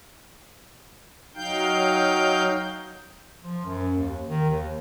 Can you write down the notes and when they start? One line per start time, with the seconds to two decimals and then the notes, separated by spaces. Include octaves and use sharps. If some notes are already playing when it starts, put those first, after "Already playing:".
1.35 F#3 D#4 F5 G5 G6
3.42 F3
3.65 F#2
3.93 D#2
4.29 D#3
4.49 D#2